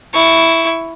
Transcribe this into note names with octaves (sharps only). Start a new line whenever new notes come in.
E4 C#6